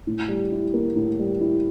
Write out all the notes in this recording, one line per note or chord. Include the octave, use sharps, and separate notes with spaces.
A2
G3
E4
A#3
A2
G3
E4